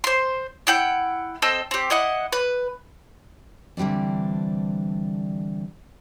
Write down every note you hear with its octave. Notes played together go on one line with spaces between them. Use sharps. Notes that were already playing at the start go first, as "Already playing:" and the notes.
C5 C6
E4 F#5 G5
C4 A4 D#5 E6
C4 G4
E4 D#5 F#5
B4
D3 E3 G3 C4 D4